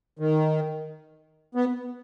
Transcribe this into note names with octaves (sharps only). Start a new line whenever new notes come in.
D#3
B3